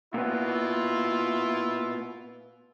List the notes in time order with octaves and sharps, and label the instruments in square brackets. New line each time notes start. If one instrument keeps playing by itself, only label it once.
[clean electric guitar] A#2 B3 [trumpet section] E4 F4